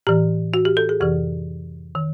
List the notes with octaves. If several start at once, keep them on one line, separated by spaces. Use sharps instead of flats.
A2 E3 G4
F#4
G4
A4
G#4
F2 C3 E3 G4
D#3